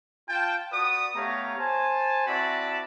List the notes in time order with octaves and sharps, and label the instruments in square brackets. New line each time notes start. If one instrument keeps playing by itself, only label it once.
[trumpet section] F4 G5 A5
F#4 B4 D5 D#6
A3 B3 G4 C#5 F5 A#5
C5 G#5 A5
C4 E4 F#4 D5 A5 B5